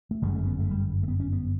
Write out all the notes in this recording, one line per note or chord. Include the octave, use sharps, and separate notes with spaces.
A3
G1 F#2 C#3 G3
A3
B3
A3
G3
A3
B3
C#4
B3